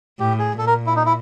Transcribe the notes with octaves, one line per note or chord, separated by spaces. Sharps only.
A2 G4
G#4
A#2 A4
A#4
E4
D#4
E4